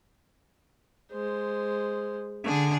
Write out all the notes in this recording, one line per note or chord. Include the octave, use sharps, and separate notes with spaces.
G#3 C5
D3 G#4